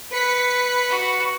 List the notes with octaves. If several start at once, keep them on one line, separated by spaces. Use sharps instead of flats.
B4 B6 C#7
F#4